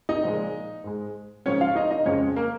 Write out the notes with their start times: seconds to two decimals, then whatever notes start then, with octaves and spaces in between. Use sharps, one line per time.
0.09 D#4 D#5
0.23 A#2 F3 G#3
0.84 G#2 G#3
1.46 G#2 F3 G#3 C#4 C#5
1.61 F4 F5
1.75 D#4 D#5
1.91 D#4 D#5
2.06 F2 C#3 F3 G#3 C#4 C#5
2.36 A#3 A#4